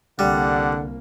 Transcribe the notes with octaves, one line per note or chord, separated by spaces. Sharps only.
C2 D3 G3 A#3 F#5